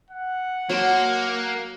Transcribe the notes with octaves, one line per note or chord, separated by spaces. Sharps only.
F#5
F#3 A#3 A5 C6